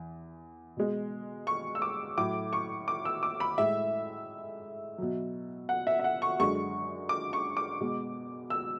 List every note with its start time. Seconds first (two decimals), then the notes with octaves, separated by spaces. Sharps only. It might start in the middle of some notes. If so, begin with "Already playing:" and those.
Already playing: E2
0.77 B2 G#3
1.47 C#6
1.75 E6
1.82 D6
2.17 A2 F#3 D6
2.53 C#6
2.88 D6
3.05 E6
3.23 D6
3.40 B5
3.57 A2 G#3 E5
4.98 B2 F#3
5.69 F#5
5.87 E5
5.99 E5
6.04 F#5
6.22 C#6
6.40 F#2 D3 G#3 C#6
7.09 D6
7.33 C#6
7.57 D6
7.80 B2 G#3
8.50 E6